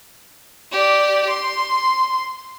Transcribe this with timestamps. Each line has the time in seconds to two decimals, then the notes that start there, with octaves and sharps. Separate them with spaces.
0.72 G4 D5
1.29 C6